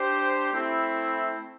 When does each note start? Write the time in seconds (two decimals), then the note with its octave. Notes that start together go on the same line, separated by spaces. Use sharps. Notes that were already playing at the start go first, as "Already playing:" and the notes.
Already playing: D4 G4 C5
0.52 A3 C4 E4